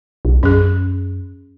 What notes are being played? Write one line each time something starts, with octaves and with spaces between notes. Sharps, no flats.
B1
F#2 C#4 G#4